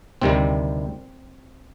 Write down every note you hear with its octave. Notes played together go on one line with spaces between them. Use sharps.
D2 C3 D#3 G3 C4